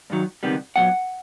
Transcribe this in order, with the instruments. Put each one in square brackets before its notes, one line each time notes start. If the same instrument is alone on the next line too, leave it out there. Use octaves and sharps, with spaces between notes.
[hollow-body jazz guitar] G2 D#3 F#3
C#2 C3 D#3 G3 B3
B1 A#2 F#3 B3 F#5